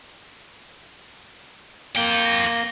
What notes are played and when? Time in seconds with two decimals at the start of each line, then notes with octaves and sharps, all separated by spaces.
1.96 A#3 F4 G5
2.25 A#6